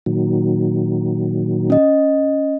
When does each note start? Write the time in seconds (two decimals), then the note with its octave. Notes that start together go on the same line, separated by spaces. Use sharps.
0.06 A#2 D#3 F#3
1.70 C#4 D#5